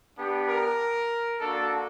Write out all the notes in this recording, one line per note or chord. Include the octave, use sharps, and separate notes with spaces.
B3 D4 G4
A#4
A#3 D4 F#4 A4